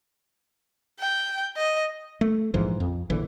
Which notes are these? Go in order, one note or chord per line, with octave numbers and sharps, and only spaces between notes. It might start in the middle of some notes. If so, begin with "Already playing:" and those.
G5
D#5
A3
A#1 G#2 E3 F3
F2
A#1 D3 E3